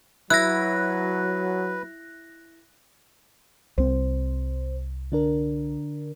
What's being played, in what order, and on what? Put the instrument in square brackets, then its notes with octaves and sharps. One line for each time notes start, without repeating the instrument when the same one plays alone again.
[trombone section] F#3 [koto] E4 [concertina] B4 [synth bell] F#6 A#6
[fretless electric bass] C2 C4 [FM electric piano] C5
[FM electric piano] D3 D4 A#4